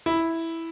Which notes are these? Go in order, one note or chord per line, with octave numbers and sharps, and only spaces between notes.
E4